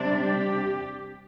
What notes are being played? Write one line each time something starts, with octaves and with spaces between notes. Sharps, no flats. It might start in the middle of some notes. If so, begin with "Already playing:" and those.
Already playing: C3 G3 D4
G4